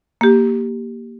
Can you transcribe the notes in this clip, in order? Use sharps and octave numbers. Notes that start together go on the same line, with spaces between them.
A#3 G4